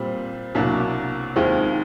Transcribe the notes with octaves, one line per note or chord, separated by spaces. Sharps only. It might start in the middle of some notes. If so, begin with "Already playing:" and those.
Already playing: A#2 G3 C4
C2 B2 F#3 A#3 D4
D#2 D#3 G#3 C4 F4